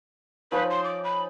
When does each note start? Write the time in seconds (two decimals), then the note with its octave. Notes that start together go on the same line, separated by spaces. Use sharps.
0.52 F3 C#4 D#4 B4
0.70 C6
0.84 D6
1.04 B5